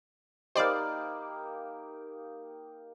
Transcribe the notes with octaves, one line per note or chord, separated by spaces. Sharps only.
A#3 D#4 G4 C5 D5 D#5 B5 F6